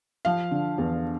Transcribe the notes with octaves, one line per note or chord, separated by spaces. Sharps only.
F3 F5
D3
E2